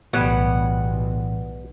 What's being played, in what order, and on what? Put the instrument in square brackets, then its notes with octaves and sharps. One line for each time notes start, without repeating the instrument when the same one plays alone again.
[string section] B1 [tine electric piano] A2 E3 [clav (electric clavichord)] G3 B3 C#5 [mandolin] F#5